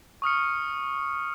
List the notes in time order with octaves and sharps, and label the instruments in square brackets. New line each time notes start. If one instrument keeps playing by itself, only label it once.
[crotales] C#6 D#6 F6 C#7